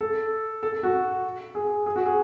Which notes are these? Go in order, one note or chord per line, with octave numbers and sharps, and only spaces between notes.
A4
A4
F#4
G#4
G#4
F#4
G#4